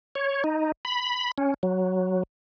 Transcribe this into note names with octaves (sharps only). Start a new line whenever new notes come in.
C#5
D#4
B5
C#4
F#3